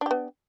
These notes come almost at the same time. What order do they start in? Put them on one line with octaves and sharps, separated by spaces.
D4 G4 B3